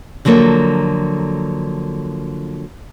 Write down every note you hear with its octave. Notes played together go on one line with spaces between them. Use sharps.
D3 F3 F#3 A#3 A4 A#4